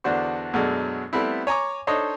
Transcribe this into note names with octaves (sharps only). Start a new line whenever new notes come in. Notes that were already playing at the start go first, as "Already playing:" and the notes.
E2 D3 D4 F#4 C5 C#6
F#2 B2 F#3 G#3 A3 D4
G3 A3 B3 C4 E4
C#5 G#5 A#5 C#6 D6
D4 D#4 A4 C5 C#5 D#5